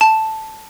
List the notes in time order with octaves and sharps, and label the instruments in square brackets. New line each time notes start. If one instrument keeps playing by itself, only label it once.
[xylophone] A5